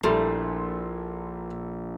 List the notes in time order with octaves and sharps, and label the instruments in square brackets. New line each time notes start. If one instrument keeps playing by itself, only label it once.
[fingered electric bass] A#1 [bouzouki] A#2 [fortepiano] G3 A3 [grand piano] E4 A4 C6